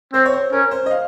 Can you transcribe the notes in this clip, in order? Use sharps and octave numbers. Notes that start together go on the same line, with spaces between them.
C4 C5
C#5
C5
C#4 A#4
C5
D#5
F5